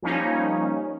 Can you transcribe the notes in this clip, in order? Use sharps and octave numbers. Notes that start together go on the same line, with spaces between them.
F3 G3 A#3 C#4 D#4